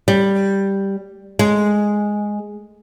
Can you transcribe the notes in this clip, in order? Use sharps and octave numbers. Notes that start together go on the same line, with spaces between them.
G3
G#3